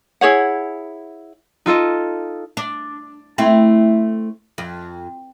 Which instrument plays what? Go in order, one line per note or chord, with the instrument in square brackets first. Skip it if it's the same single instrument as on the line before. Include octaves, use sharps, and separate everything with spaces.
[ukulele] E4 G#4 C#5 F#5
[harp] D#4 F4 A4 D#5
[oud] D4
A3 C4 E4
F2